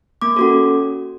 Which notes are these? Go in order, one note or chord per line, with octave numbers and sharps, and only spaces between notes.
A#3 D6
C#4 F#4 A4